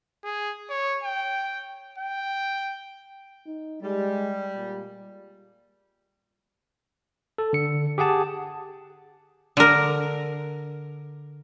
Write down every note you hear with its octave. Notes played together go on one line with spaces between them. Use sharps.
G#4
C#5
G5
G5
D#4
G3 G#3
A#2
A4
D3 C#7
G4 G#4 F#5 A5
D3 A#4